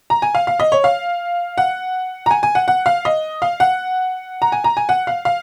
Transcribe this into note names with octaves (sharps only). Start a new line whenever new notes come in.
A#5
G#5
F5
F5
D#5
C#5
F5
F#5
A#5
G#5
G#5
F#5
F#5
F5
D#5
F5
F#5
A#5
G#5
A#5
G#5
F#5
F5
F5